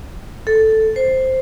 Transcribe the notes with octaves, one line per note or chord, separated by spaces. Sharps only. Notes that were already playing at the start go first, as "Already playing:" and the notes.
A4
C5